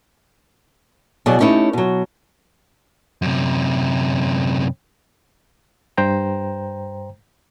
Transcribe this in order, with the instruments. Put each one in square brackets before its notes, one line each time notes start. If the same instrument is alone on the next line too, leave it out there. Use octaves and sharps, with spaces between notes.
[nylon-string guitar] B2 F#3 E4 G#4 D5 D#5
A3 B3 C#4 D#4 E4 G4
B2 F#3
[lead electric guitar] F#2 C3
[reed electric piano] G2 C5 G5 A#5